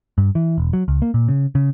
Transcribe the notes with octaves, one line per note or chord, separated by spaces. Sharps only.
G2
E3
E1
F#3
C#2
A#3
A#2
C#3
C#3